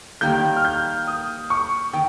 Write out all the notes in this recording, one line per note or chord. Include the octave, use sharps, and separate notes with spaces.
D#3 G3 A#3 G6
F6
G6
D#6
C#6
D#3 G5